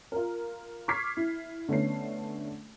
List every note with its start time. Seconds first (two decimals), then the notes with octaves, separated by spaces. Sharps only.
0.12 F4 A#4
0.88 C#6 D6 F6 G#6 B6 C7
1.17 E4
1.68 D3 A3 B3 C#4 C7